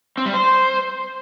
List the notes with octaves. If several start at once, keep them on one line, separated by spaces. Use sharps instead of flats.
C4
G3
C5